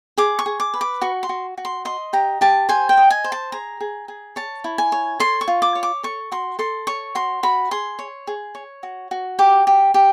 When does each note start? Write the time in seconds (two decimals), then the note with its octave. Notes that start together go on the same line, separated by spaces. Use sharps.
0.18 G#4 D6
0.39 C#6
0.46 G#4
0.60 D6
0.74 B4
0.81 D6
1.01 F#4 C#6
1.23 C6
1.29 F#4
1.58 F#4
1.65 C6
1.85 D#5 C6
2.13 G4 A#5
2.41 G4 A5
2.69 C5 G#5
2.89 G5
2.97 D#5
3.10 G#5
3.24 C5
3.32 A5
3.52 G#4 A#5
3.81 G#4
4.08 G#4
4.36 C#5 A5
4.64 E4
4.78 G#5
4.92 C#5
5.20 A4 C6
5.41 C#6
5.48 F4
5.62 D6
5.75 C#5
5.83 D6
6.03 A4 C#6
6.32 F#4 C6
6.59 A4 C6
6.87 C#5 C#6
7.15 F#4 C6
7.43 F#4 B5
7.71 G#4 C6
7.99 C#5
8.27 G#4
8.55 C#5
8.83 F#4
9.11 F#4
9.39 G4 D6
9.67 G4
9.94 G4